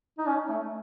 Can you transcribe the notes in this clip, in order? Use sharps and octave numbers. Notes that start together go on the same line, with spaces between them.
D#4
C#4
A3